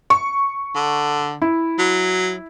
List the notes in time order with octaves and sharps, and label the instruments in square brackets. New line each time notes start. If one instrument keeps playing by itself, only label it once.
[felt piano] C#6
[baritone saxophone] D3
[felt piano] E4
[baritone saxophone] F#3